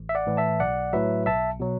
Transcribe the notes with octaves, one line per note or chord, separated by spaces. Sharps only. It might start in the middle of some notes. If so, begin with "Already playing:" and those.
Already playing: A1
E5
D5 F#5
A2 E3
E5 A5
B1 D5 F#5
A2 F#3 B4 E5
B1 E5 A5
B2 F#3